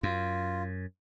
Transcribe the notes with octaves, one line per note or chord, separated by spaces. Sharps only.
F#2 F4